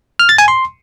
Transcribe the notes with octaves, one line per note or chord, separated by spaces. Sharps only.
F6
A6
G#5
C6